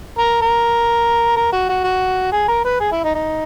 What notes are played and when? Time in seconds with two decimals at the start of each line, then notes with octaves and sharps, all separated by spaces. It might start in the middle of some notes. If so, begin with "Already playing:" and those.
0.18 A#4
0.42 A#4
1.36 A#4
1.52 F#4
1.69 F#4
1.84 F#4
2.32 G#4
2.48 A#4
2.64 B4
2.80 G#4
2.92 E4
3.04 D#4
3.15 D#4